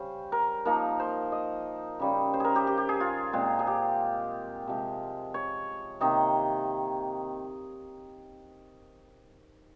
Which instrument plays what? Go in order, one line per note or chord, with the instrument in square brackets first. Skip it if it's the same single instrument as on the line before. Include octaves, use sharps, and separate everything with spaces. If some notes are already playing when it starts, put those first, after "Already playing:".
Already playing: [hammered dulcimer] C#3 G3 C#4 C5
A#4
F3 A#3 D#4 A#4
C5
D#5
C#3 G3 C#4
C5
G#4 A#4
G4
G4
G4
G#4
F4
A#2 G#3 C4
G#4
G4
C3 F3 G#3
C#5
C3 D#3 A#3 D#5